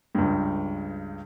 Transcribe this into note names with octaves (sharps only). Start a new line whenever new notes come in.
C#2 G2